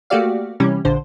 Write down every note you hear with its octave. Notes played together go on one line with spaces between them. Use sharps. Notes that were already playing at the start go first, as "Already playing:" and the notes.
A3 A#3 F#4 G4 D5 F5
C3 E3 G3 C#4
A#1 D3 C5